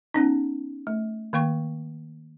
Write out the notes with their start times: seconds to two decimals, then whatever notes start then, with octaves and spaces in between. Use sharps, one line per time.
0.14 B3 C#4 D#4
0.87 A3
1.33 D#3 A#3 G5 C#6